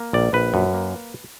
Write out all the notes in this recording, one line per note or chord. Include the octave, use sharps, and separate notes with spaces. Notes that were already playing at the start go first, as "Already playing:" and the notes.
Already playing: A#3
A#1 D5
A#1 B4
F#2
A#3